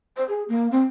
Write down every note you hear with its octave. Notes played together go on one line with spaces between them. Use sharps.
C5
G#4
A#3
C4